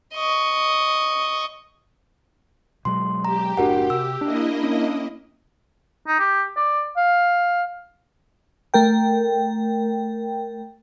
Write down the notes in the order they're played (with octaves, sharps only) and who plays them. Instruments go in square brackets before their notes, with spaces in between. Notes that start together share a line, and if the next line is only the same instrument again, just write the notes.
[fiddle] D#5 C#6
[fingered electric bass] B2 F#3 G#3 [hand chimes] C6
[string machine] G4 [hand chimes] A#5
[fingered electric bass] F#1 A2 D4 [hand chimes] F#4 A#4 F#5
[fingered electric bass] C3 [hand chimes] E6
[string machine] A#3 E4 D#5 [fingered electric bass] D4
[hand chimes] C#4
[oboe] D#4
G4
D5
F5
[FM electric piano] A3 A#4 G5